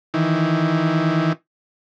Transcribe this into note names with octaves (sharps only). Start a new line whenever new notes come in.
D#3 E3